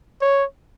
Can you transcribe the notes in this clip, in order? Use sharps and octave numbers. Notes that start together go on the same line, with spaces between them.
C#5